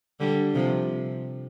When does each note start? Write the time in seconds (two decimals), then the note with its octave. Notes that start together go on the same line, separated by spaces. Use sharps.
0.20 D3 G3
0.54 C3 F3